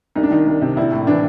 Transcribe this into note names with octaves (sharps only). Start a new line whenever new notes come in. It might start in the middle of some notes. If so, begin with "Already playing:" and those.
C2 D#4
D4
D#3 D#4
C2
C3
A#1 E4
A2
E3 D4